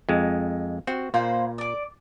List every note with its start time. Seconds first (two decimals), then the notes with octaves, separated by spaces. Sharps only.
0.09 F2 G#3
0.87 C4 F#4
1.14 A#2 A#3 C5 B5
1.58 D5 D6